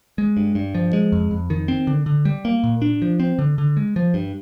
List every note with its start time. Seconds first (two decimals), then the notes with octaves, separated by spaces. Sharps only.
0.18 G#3
0.37 G2
0.55 G2
0.75 F3
0.93 G#3
1.12 F2
1.31 F2
1.50 D#3
1.68 C4
1.87 D3
2.06 D3
2.25 G3
2.45 A#3
2.64 A#2
2.82 D4
3.02 F3
3.20 C4
3.39 D3
3.58 D3
3.77 G#3
3.96 F3
4.14 G2